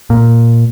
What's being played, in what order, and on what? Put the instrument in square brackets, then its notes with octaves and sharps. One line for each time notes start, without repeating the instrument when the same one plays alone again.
[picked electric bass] A#2